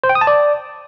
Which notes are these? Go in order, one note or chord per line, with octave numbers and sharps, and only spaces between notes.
C5
G5
D#6
A5
D5